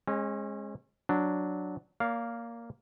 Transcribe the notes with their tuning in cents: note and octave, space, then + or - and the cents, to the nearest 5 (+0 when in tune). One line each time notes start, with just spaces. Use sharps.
G#3 -5 C#4 -35
F#3 +0 D4 +0
A#3 +0 D5 -40 F5 +0